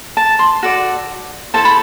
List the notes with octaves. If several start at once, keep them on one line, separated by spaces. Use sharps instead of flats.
A5
C6
F#4 A4 D5
E4 A4 C5 A5
B5